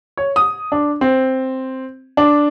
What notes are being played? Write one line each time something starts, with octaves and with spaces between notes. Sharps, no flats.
C#5
D#6
D4
C4
D4